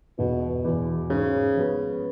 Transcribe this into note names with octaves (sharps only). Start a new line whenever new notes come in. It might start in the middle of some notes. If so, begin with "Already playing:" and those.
E1 B2
E2 B2
G#2 C#3
F3 G#3 B3